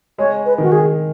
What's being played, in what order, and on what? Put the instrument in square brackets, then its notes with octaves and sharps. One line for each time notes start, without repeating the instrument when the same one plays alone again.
[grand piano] G#3 [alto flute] C#5
[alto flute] B4
[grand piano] D#3 [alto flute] F#4
[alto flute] G#4